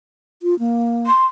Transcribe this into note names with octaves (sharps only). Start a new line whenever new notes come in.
F4
A#3
C6